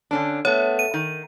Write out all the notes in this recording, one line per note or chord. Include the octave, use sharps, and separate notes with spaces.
D3 C#4 D4
A3 B3 C#5
D#7
D#3